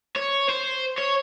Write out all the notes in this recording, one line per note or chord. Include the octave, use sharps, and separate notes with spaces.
C#5
C5
C#5